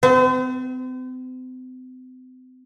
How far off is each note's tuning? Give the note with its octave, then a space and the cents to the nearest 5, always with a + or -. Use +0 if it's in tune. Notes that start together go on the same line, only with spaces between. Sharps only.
C4 -40 C5 -40